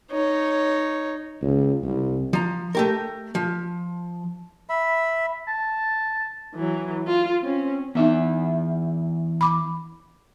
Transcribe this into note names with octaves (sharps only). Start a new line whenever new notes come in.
D#4 C#5
C#2
C2
F3 A#5
A3 G4 A#4
F3
E5 B5
A5
E3 F#3
F4
C4 C#4
E2 B3 D#4 E5
B5 D6